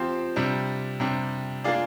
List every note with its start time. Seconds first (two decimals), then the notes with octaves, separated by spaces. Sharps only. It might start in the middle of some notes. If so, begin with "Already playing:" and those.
Already playing: F3 C4 G4 C5 F5
0.36 C3 G3 D4
1.00 C3 G3 D4
1.64 A#3 D4 F4 G#4 D5